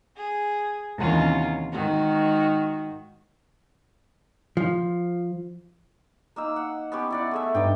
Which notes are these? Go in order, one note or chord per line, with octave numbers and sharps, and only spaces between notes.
G#4
D#2 C3 E3 C#4 F4 F#5
G#2 D#3 F#4
F3
A#3 D#4 E6
F#5
B3 C#4 G4
E4 D5 F#5
A3 G#4 E5
G2 D#4 D5 G5